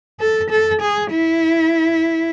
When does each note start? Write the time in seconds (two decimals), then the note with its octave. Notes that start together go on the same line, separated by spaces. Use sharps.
0.20 A4
0.50 A4
0.81 G#4
1.11 E4